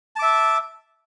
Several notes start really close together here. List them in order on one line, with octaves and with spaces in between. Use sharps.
A5 D6 E5